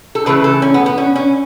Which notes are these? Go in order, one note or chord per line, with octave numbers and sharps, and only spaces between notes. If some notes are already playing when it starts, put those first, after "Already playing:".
A4
C#3 E3 A3 B4
A4
C#4
B3
B3
C#4
C#4